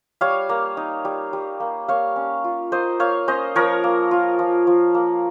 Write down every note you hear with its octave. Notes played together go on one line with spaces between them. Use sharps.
G3 C#5 F5
A#3
D#4
G3
G3
A#3
A#3 C#5 F5
C#4
F4
A#3 C5 D#5
A#3 C#5 F5
C#4 C5 D#5
F3 A#4 C#5
A#3
F4
F3
F3
A#3